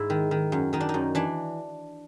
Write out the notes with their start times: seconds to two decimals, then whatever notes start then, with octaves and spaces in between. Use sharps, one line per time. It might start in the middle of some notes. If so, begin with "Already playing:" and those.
Already playing: G#2 E4
0.10 D#3
0.31 D#3
0.52 F#2
0.73 D#3 D#4
0.80 D4
0.89 D#4
0.94 F#2
1.15 E3 D4